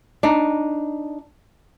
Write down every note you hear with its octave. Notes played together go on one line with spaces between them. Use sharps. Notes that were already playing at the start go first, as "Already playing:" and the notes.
D4 D#4